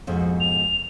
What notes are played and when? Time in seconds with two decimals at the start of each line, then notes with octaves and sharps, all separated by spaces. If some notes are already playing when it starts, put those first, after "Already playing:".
0.07 F2 G#2 B2
0.40 F7